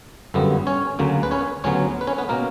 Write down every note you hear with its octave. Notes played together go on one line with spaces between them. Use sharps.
G1 F#2 D3 G3 B3
C#4 C#5
D2 C#3 F#3 A#3
B4
C#4 C#5
D2 C#3 F#3 B3 C#4 C#5
B4
C#4 C#5
B3 B4
B2 A#3 C#4 A#4